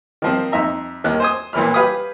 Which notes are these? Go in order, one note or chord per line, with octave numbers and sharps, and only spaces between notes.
D#3 F3 C4
F2 D#4 E5 A#5
D#2 D#3 F#6
C5 G#5 D#6
B1 A#2 E3 B5 F6
G4 B4 F5 G#5 B5 D#6